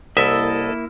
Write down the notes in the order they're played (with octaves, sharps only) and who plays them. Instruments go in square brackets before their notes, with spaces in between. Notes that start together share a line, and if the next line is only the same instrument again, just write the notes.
[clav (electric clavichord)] C2 E5 [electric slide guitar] A#3 E4 [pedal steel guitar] A4 D#5